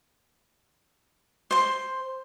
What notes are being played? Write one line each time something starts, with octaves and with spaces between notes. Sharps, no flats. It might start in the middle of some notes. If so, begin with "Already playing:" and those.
C5 C6